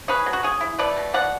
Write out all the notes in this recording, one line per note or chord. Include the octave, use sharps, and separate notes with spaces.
C#4 G#4 B4
F#3
F#4
C#4 G#4
E4
A3 B4 D5
B2
B2 D5 F#5